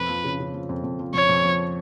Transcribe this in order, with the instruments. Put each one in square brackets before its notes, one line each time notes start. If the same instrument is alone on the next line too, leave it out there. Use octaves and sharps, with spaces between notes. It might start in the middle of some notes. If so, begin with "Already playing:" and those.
Already playing: [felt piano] F2 [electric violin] B4
[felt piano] F3
C#3
C#3
F3
F2
F2
F3
[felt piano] F2 [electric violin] C#5
[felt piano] F2
F3